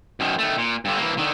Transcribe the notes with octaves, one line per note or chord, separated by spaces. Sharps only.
F#2 D#3
D#3 A3
A#2
G2 D3
E3 A#3
D3 D#3